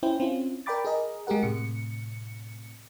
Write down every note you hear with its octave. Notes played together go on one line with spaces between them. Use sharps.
C#4 E4 C5 G5
C4 C#4 E4 F4
A#4 D5 G5 B5 D6 A6
G#4 A#4 D#5
G#3 G4 G#4 A#4 F#5
A2 C3 C#7